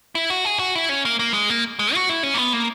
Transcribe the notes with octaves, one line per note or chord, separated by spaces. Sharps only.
E4
F#4
G#4
F#4
E4
C#4
A#3
A#3
G#3
A#3
G#3
F#4
E4
C#4
A#3
B3
A#3